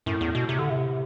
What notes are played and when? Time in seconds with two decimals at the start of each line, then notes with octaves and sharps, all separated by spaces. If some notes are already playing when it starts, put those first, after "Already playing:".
0.06 F#2 A2
0.21 E2
0.35 B2
0.49 C3
0.59 D3
0.70 C3